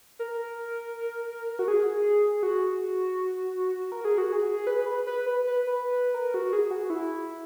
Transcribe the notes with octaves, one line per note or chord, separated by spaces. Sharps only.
A#4
F#4
G#4
F#4
A#4
G#4
F#4
G#4
B4
B4
B4
B4
B4
B4
A#4
F#4
G#4
F#4
E4